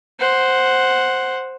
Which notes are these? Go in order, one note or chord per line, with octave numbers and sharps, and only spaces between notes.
C5 F#5